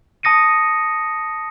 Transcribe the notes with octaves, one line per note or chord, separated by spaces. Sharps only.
A5 D#6 A#6 C#7 D#7